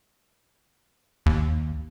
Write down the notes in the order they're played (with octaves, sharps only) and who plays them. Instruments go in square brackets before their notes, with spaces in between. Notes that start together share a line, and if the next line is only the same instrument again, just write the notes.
[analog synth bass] D#2